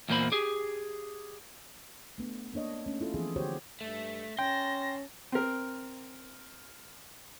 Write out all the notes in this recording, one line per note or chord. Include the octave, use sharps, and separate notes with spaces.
E2 A#2 A#3 C5 B5
G4 G#4
A3 B3 D4
A#3 D4 C#5 D#5
A3 C#4
E4 F4 A4
E3 F3 B3 G#4
D3 F#4 G4 C5 C#5
G2 A3 E5
C#4 G5 A5 C6 A#6
C4 A#4